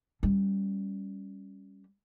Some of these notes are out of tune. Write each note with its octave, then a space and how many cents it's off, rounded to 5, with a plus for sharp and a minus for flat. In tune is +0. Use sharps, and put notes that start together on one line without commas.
G3 +0 C#4 -5